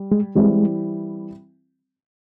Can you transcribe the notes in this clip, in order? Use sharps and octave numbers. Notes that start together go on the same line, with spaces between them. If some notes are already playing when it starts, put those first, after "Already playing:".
Already playing: G3
G#3
E3 G3 G#3 C4 E4